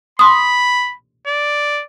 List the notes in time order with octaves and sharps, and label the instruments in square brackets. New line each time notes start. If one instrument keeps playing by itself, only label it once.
[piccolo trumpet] B5 [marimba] C6 D#6
[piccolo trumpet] D5